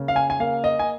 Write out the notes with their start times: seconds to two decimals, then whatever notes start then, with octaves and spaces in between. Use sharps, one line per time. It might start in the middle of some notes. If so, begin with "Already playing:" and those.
Already playing: C#3 A#3
0.08 F5
0.16 G#5
0.30 G#5
0.40 A#3 F5
0.64 D#5
0.79 G#5